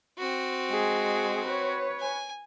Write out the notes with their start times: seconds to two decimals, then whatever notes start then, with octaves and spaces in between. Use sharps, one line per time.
0.18 C4 F#4
0.70 G#3 G#4
1.44 B4 C#5
2.00 G#5